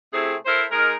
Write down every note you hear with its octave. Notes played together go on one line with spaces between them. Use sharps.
C3 A3 C4 E4 G#4
E4 A4 A#4 C5
G#3 D#4 A#4